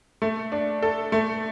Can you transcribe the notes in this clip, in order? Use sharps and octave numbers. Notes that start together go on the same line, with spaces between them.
A3
D4
A4
A3